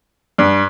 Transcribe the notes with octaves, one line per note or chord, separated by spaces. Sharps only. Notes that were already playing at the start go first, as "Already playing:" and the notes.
G2